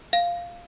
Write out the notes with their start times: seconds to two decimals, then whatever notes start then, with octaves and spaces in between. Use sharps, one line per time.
0.13 F5